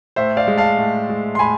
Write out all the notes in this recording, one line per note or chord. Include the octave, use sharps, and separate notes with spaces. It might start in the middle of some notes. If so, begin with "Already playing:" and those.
A2 C5 E5
D5 F5
G#3
F5 A5
A2
G#3
C6
A2 G#5 B5